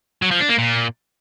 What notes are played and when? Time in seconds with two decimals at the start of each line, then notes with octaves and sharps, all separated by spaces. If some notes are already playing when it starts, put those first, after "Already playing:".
0.22 F#3
0.31 F3
0.40 D4
0.49 A#3
0.58 A#2